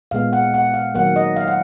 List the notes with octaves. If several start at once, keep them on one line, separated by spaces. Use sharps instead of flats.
A#2 G#3 B3 F5
F#5
F#5
F5
D#3 F#3 A#3 F#5
D#5
F5
F#5